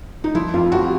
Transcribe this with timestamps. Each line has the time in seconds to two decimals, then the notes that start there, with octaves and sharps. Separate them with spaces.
0.24 D#4
0.35 F3 E4
0.53 F2 F4
0.72 F2 F#4
0.84 G4